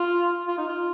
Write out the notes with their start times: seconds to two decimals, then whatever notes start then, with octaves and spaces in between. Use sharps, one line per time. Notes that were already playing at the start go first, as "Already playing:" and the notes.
Already playing: F4
0.47 F4
0.58 D#4
0.68 F4